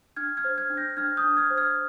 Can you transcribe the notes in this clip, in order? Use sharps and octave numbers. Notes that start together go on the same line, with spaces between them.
D4 F6 G#6
F6 G#6
C5
F6 G#6
D4
G6 A#6
D4 F6 G#6
D#6 G6
D4
F6 G#6
C5
F6 G#6